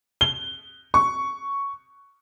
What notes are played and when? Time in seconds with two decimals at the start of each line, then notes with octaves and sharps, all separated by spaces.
0.21 G7
0.94 C#6